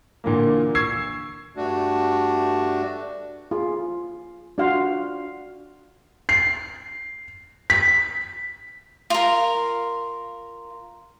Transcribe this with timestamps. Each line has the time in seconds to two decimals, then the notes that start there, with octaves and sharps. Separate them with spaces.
0.24 A#2 D3 E3 A#3
0.75 C#6 E6 G#6 C7
1.57 G2 A3 D4 F#4
3.51 F4 G#4
4.58 D4 F4 F#4 F5 F#5 C6
6.29 C7
7.70 B6
9.10 F4 A#4